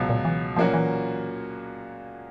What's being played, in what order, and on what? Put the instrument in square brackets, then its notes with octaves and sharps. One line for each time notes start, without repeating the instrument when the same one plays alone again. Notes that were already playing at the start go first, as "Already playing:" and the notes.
Already playing: [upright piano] C#2 B2 F#3
[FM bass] A#2
E3
[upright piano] A#2 F#3 A#3 C#4 F#4 [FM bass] F3
[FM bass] E3